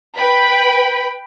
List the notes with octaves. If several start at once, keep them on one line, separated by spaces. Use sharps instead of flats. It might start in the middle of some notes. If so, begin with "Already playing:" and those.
B4 G5 B5